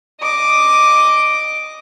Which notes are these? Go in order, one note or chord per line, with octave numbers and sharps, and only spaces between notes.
D#5 D6